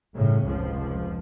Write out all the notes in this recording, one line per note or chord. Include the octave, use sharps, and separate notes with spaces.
G1 A2 C#3 C#4
F1 C#2 F3